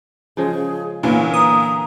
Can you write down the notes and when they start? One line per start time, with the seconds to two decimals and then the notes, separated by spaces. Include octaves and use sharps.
0.37 C#3 F3 G#3 G#4
1.03 A#2 D3 E3 B3 C#4
1.34 A#5 D#6